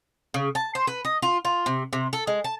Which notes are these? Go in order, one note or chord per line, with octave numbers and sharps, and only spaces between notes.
C#3
A5
C5
B4
D#5
F4
F4
C3
C3
A4
G#3
A5